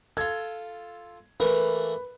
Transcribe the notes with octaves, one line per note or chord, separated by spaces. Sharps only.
F4 A4 G#6
E3 A3 A#3 B4